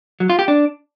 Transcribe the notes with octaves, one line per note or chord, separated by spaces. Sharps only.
F#3
F4
G4
D4